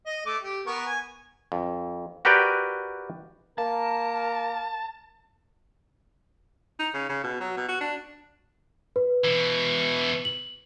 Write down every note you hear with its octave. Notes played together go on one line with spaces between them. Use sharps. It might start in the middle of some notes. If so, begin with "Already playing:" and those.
D#5
A3 D6
G4
B3 A#4 C#6
G#5
F2
F#4 G4 A#4 B4 D5 G5
A#3 A#4 A5
D#4
C#3
C#3
B2
F#3
B2
F#4
D4
B4
B2 E3
F#7